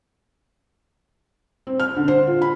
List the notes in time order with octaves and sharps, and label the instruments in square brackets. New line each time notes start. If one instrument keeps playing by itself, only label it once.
[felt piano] C4
F6
D3
C5
F4
B5